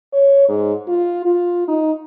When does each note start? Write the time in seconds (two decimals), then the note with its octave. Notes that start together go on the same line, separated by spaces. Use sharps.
0.13 C#5
0.48 G#2
0.88 F4
1.25 F4
1.68 D#4